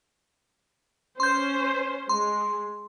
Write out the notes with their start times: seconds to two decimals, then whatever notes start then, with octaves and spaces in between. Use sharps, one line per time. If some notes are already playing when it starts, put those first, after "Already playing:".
1.20 C#4 C5 C6 G6
2.09 G#3 C6